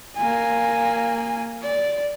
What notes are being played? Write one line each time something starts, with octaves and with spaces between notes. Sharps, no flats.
A#3 G#5
D5